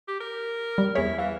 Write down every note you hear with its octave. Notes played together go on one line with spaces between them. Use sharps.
G4
A#4
G3
E2 E4 G#4 C#5
E3 F5